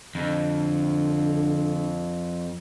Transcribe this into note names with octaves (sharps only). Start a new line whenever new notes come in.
F2 D3